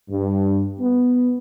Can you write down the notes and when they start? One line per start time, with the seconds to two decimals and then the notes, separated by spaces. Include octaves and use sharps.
0.10 G2
0.80 B3